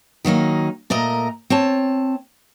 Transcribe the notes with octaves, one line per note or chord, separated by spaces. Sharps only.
D#3 F#3 A#3 D#4
A#2 A3 A#4 D#5 A#5
C4 C#5 A5